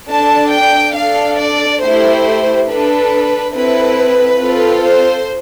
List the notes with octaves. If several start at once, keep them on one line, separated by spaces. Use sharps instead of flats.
D4 A4 A5
G5
D4 A4 F5
D5
A3 E4 G4 C5
D4 A4 B4
C4 E4 A4 B4
C4 F4 A4
C5